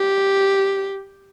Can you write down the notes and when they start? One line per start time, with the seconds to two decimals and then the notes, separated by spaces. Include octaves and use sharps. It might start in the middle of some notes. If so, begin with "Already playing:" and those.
Already playing: G4